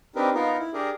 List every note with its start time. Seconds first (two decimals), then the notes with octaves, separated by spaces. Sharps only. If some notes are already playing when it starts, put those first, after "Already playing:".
0.16 C4 D4 D#4 G4 A#4 B4
0.35 B3 D#4 F4 A#4
0.59 E4
0.73 D4 G4 G#4 A#4